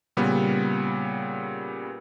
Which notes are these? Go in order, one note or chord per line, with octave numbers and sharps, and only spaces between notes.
A#2 C#3 G3 B3